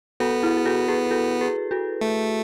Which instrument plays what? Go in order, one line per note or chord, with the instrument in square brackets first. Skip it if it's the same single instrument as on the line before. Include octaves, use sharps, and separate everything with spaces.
[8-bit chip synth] B3 [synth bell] F#4 A4
[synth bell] E4 G#4
G#4
F#4 A4
G#4 B4
F#4 A4
G#4 B4
F#4 A4
[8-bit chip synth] A3